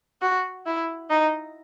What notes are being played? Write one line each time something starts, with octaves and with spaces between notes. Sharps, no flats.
F#4
E4
D#4